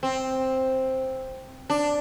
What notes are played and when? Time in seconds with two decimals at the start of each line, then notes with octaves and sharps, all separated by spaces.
0.03 C4
1.70 D4